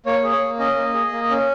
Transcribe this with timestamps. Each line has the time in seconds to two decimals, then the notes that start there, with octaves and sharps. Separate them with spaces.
0.06 A#3 C#5
0.24 G#4
0.32 C#5
0.41 A#3
0.59 C#4 D#5
0.76 A#3
0.94 G#4
1.11 A#3
1.30 C#4